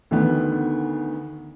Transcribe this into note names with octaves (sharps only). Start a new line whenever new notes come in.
D2 D3 D#3 B3